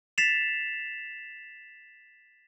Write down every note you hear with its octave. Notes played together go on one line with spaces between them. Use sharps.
A6 B6 C7 E7 F7